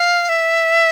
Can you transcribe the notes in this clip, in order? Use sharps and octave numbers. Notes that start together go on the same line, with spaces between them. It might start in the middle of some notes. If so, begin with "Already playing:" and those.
Already playing: F5
E5